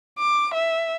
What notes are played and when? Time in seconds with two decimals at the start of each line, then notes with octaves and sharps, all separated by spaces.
0.19 D6
0.54 E5